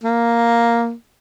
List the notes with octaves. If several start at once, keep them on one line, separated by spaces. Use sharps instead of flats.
A#3